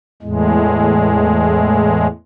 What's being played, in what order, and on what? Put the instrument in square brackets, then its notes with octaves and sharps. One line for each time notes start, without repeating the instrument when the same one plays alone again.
[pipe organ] E2 A2 G#3